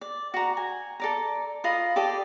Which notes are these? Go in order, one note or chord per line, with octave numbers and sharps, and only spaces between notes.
D5
F#4 A#5
G#5
A4 D5 A#5
F4 D#5 B5 D#6
G4 A4 D5 D#5